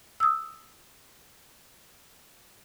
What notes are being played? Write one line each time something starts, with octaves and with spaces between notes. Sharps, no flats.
D#6 E6